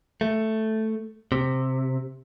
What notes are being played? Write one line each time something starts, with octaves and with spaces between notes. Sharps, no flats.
A3
C3